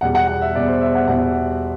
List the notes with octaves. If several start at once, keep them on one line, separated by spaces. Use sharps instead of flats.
E2 B2 G3 F#5
F#5
F#5
E5
E2 B2 G3 D5
C5
E5
F#5
E2 B2 G3 F#5
E5